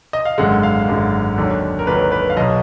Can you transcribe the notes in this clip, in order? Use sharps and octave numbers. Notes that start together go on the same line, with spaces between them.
D#5
F5
G#1 F#2 D3 G#3 F#5
F5
G#1 F#2 D3 G#3
D#2 D3 F#3
A#4
D#2 D3 F#3 B4
B4
F5
B1 B2 F#3 D#5